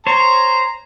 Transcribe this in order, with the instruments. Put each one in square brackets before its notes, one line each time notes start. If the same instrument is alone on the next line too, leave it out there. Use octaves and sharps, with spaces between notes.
[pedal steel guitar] C5 C#5 [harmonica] A#5